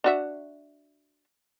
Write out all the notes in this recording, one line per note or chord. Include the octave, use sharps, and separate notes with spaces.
D4 F#4 E5